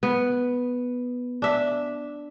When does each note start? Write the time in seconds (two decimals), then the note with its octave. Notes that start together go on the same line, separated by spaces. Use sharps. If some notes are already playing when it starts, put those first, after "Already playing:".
0.03 B3
1.42 D4 E5